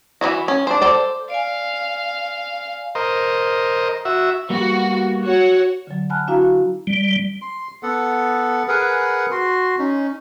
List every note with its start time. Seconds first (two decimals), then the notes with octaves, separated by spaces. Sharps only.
0.21 E3 F#3 E4 F#4
0.48 C#4
0.67 D4 C5
0.82 A4 C5 D5
1.30 D5 F5 G#5
2.95 A#4 C5 D#5
4.05 F#4 E5
4.50 G3 A#3 B3 F#4
5.22 F#4 C#5 F#5
5.87 D3 F#3
6.10 F#5 G#5 A5 B5 F6 F#6
6.28 D4 E4 F#4 F5 A#5
6.87 G3
7.42 C6
7.83 B3 A4 F#5
8.68 G#4 A#4 B4 F#5
9.31 F#4 C6
9.79 C#4 D#4